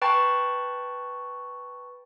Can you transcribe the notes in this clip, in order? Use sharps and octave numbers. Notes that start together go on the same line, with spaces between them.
B4 G5 A5 B5 C#6 A6